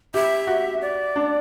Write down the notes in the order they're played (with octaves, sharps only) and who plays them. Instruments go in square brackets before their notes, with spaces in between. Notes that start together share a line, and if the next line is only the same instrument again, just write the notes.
[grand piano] G4 [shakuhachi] E5
[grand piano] F#4
[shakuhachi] D5
[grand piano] D4